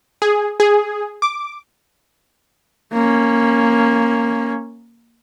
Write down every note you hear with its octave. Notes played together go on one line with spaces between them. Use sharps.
G#4
G#4
D6
A#3 C#4